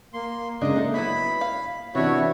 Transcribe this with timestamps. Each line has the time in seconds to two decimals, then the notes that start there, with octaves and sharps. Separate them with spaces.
0.13 A#3 C6
0.61 C#3 G#3 D4 A#4 D#5
0.76 A#3 D#4 A4 E5
0.94 F#3 B3 E4 B5
1.41 F5
1.95 C3 E3 B3 D4 E4 F#4 C#5